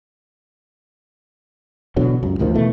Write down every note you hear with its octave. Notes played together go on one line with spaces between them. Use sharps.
E1 B2 D3 F#3
C#2 F#2
A1 D2 D#3 F3
B2 E3 A3